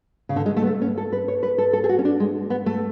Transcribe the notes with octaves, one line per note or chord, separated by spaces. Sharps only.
C#3
D3
G#3
A3
B3
A3
C#4
A4
B4
C#5
B4
A4
A4
G#4
F#4
C#4
D4
G#3
B3
A3